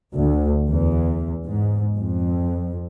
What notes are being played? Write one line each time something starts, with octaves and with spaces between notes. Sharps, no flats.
D2
E2
G#2
F2